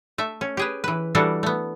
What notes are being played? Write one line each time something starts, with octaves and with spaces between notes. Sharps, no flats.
A3 E5
C#4
G4 G#4 B4
E3 B4
E3 G3 D4 F#4 A4
A3 B3